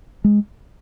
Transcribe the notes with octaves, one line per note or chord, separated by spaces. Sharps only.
G#3